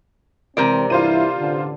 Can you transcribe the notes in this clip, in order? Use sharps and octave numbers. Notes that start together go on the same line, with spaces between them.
C3 E3 G#3 C4 A#4 D5
G2 E3 E4 F4 C5 D#7
A1 D3